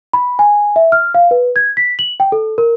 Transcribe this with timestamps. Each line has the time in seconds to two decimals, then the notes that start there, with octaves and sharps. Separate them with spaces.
0.14 B5
0.39 G#5
0.76 E5
0.92 F6
1.15 F5
1.31 B4
1.56 G#6
1.77 B6
1.99 F#7
2.20 G5
2.32 A4
2.58 A#4